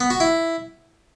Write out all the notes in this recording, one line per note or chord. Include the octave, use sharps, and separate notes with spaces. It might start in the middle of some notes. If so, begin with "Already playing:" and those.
B3
F#4
E4